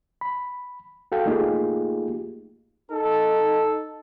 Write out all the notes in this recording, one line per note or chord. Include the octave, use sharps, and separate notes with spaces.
B5
F#4 A4 F5 G5
A3 A#3 D#4 F4 G4 G#4
D#4 A4